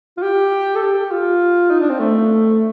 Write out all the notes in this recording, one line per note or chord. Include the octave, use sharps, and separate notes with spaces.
F4
G4
A4
G4
F4
D#4
D4
C4
A3